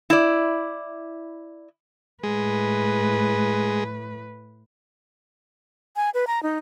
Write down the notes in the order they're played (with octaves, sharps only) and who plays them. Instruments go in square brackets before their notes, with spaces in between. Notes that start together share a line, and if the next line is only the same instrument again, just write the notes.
[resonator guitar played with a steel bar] E4 D5
[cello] A2 B4 [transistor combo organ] G#3
[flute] G#5
B4
A#5
D#4